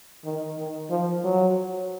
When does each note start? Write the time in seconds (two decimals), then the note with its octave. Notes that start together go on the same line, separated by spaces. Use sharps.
0.25 D#3
0.58 D#3
0.90 F3
1.24 F#3